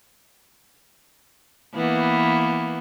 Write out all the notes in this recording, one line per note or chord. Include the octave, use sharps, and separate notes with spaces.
E3 A#3 B3